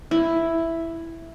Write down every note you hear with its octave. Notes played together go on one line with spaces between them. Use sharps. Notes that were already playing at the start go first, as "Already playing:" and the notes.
E4